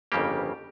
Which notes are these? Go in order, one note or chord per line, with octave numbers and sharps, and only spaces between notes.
G1 F2 C#3 G3 A#3 G4